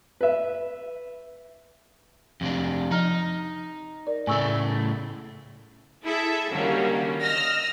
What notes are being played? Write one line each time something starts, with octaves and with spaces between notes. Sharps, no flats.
B4 E5
F2 C3 D4
F3 D#4 A#5 F6
A#4 D5
A2 C#3 A3 G#5 C#6 E6
E4 G#4 A4 E5
D3 D#3 F#3 G3 A#3 C#4
D#5 E6 F6 A#6